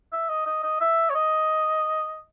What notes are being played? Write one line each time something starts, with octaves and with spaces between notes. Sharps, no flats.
E5
D#5
D#5
D#5
E5
C#5
D#5